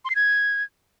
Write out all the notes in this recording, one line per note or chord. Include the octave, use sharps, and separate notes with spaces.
C6
C7
G#6